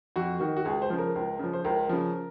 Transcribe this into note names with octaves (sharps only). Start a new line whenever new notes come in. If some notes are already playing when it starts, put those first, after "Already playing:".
F2 F#4
D#3 F#4
F#4
C#2 G#4
C5
C#3 F3
A#4
C#2
C#3 F3
C5
C#2 A#4
C#3 F3